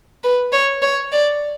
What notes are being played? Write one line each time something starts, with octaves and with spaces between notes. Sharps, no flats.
B4
C#5
C#5
D5